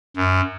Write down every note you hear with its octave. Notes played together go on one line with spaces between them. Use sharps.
F#2